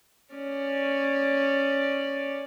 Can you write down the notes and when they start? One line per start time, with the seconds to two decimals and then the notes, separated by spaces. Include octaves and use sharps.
0.35 C#4 D5